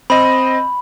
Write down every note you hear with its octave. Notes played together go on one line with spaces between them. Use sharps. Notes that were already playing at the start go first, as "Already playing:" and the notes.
C4 D#5 B5